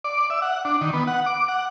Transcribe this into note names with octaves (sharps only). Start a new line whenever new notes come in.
D5
E5
F#5
D4
D#3
B3
F#5
D6
F#5